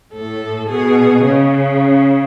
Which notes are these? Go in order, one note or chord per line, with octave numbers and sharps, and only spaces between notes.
A2 A4
B2 G#4
C#3